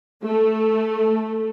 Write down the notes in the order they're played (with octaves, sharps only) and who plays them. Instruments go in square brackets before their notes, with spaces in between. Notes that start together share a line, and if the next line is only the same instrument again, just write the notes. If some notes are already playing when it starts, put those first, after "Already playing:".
[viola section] A3